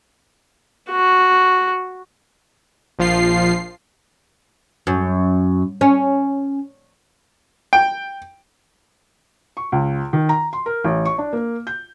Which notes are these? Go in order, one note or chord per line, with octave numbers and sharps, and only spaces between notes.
F#4
A#1 F3 F4 C7
F#2
C#4
G5
C#6
C#2
D#3
A#5
C6
A#4
A1
C#6
D4
A#3
G6